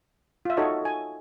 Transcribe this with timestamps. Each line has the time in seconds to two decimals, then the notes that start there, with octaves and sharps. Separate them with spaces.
0.45 F4 E5
0.57 D#4 F#4 A4 C#5 D#5
0.82 A4 G#5